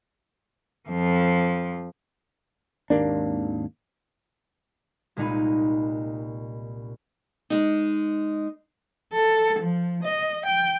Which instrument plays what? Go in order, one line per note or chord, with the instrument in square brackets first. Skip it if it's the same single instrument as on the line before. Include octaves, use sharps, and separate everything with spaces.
[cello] F2 F3
[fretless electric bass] G#1 D#2 A#3 D4
[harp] C2 A#2 G#3 D#4 D#5 B5
[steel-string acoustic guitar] G#3 D#4
[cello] A4
F3
D#5
G5